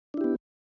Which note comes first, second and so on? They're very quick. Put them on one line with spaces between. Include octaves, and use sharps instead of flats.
D4 E4 G4 B3